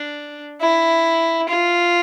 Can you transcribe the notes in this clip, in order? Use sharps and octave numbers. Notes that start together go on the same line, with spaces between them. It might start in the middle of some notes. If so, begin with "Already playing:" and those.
Already playing: D4
E4
F4